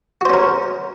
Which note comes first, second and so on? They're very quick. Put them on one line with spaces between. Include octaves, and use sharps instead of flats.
F#4 C5 C#4 A#4